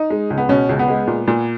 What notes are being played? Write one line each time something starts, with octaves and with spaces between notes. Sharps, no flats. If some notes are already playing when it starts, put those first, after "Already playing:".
Already playing: D#4
G#3
C#2
B3
B2 C#4
C#2
B3
G#3
A#2
A#2